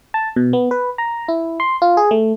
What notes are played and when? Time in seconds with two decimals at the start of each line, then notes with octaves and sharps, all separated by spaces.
0.14 A5
0.36 B2
0.53 B3
0.71 B4
0.98 A#5
1.28 E4
1.60 C6
1.82 F4
1.97 G#4
2.11 A3